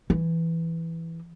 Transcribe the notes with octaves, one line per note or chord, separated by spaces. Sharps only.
E3